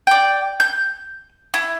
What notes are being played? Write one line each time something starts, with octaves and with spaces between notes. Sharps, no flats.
D5 G5
G6
E4